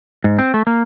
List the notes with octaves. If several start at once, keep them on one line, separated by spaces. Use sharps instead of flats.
G#2
C4
A3
A#3